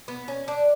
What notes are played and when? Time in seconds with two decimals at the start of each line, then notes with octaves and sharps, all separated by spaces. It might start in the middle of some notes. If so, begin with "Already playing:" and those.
0.08 B3
0.28 C#4
0.48 D4